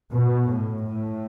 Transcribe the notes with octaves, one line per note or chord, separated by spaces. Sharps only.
B2
A2
A2